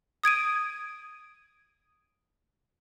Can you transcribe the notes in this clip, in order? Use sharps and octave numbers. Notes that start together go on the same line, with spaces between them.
D#6 G#6 D7 D#7